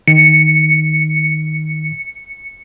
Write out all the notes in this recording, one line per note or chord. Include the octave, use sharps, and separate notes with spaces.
D#3 C#7